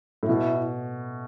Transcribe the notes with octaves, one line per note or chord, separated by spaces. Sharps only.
A2
B2 E4